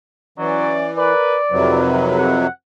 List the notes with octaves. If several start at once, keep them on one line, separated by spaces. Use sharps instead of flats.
E3 F#3 C#4 D5
A#4 B4 D5
F2 C3 F#3 D#4 A#4 B4
F#5